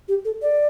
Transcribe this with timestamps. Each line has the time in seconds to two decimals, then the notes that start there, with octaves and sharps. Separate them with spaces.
0.08 G4
0.25 A4
0.42 D5